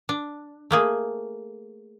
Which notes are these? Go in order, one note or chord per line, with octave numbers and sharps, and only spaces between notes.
D4
A3 A#3 G#4